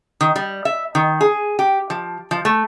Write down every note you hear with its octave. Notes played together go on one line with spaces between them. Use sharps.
D#3
G3
E5
D#3
G#4
G4
F3
F3
A3